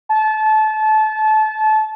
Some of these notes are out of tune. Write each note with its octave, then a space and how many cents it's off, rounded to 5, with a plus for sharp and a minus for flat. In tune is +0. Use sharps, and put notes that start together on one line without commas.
A5 -25